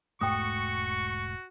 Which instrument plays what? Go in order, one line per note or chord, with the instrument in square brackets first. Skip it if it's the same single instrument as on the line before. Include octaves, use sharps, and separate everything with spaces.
[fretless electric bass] E1 G#2 A3 [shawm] F#4 [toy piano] G5 D#6 [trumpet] C#6